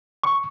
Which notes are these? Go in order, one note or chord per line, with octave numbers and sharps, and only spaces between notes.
C#6